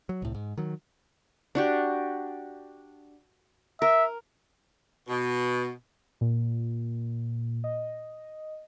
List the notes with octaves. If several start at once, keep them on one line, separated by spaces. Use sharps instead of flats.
F#3
C2 A2
G#2
D#3 F#3
D4 F#4 G4
A#4 E5
B2
A#2
D#5